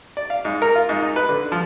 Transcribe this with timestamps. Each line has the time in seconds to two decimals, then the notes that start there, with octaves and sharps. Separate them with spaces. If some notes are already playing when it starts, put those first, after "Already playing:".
0.17 D5
0.30 F5
0.45 G#2
0.62 A#4
0.75 F4
0.89 G#2
1.02 D#4
1.16 B4
1.29 D3
1.52 F3